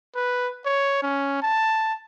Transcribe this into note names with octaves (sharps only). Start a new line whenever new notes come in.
B4
C#5
C#4
A5